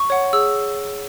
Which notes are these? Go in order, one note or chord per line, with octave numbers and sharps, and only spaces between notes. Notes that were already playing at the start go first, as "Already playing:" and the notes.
Already playing: C#6
C#5 F#5
G#4 E6